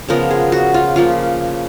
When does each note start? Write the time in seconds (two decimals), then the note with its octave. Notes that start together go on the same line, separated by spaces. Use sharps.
0.09 C#3 F3 G#3 B3 A#4
0.31 G#4
0.52 F#4
0.74 F4
0.96 C#3 F3 A#3 F4